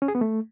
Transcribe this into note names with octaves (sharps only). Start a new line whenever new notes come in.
C#4
G#4
B3
A3